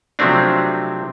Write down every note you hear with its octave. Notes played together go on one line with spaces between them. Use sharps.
C3 F3 F#3 A3 C4 D4